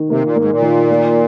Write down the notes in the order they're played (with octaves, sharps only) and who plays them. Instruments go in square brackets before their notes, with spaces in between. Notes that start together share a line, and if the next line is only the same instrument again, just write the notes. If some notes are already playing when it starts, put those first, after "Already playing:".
Already playing: [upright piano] D#3
[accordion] C3 [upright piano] A#3
[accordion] A#2
[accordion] G#2 [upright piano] A#3
[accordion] A#2
[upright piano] D#3
A#3